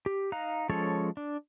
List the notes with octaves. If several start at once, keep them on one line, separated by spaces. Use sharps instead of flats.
G4
D#4 F5 A#5 F#6
F3 G#3 C#4 A4 C#5
D4